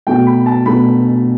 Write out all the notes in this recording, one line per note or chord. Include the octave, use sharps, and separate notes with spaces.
B2 A3 G5
B5
A5
B2 A3 B5